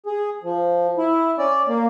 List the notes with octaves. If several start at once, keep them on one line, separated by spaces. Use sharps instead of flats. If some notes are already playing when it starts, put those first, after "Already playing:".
G#4
F3
E4
C#4 D5
A#3